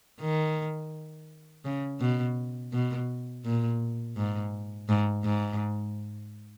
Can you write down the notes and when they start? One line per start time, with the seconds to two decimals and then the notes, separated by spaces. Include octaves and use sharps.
0.21 D#3
1.65 C#3
2.00 B2
2.73 B2
3.45 A#2
4.17 G#2
4.89 G#2
5.24 G#2